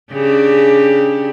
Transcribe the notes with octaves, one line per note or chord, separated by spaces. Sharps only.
C#3 D4 G4